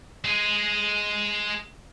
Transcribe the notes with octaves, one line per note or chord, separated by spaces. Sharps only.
G#3 G#4